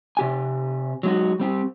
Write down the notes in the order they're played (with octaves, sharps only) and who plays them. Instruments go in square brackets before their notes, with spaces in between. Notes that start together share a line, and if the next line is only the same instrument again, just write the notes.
[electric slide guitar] C3 G4 G#5
F#3 G#3 D#4 F#4
G3 C4 G4